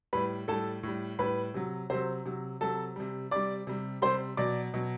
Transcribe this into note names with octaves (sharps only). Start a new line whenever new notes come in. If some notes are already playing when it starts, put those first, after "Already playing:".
A2 G3 B4 B5
A2 G3 A4 A5
A2 G3
A2 G3 B4 B5
C3 F#3
C3 F#3 C5 C6
C3 F#3
C3 F#3 A4 A5
C3 G3
C3 G3 D5 D6
C3 G3
C3 G3 C5 C6
B2 F#3 D5 D6
B2 F#3